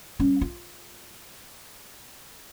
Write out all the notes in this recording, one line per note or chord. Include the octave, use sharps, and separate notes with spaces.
G3 C#4
F4